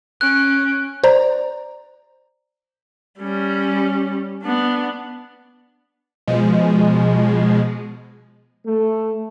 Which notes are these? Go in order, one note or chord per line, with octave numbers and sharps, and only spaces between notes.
C#4 F#6 D7
C5 D5 A#5
G3 C#4
B3 D4
B2 F3 G#3
A3